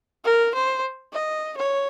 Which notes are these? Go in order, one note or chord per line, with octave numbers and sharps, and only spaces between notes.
A#4
C5
D#5
C#5